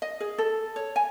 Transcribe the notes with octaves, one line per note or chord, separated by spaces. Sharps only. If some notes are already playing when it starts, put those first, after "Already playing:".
D#5
G#4
A4
C#5
G#5